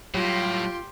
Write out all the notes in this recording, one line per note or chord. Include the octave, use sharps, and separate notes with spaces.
A2 F#3 G3 F4 G4 C6